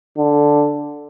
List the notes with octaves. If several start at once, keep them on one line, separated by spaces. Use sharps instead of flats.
D3